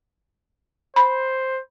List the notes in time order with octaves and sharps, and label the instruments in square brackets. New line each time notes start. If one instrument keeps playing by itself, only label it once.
[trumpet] C5 [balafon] B5